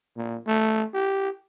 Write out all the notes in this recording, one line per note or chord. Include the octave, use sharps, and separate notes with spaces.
A#2
A3
G4